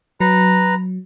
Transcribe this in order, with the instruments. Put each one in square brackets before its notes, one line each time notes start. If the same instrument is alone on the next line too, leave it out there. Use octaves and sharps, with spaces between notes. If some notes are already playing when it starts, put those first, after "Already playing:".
[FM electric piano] F#3 [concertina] B4 A#5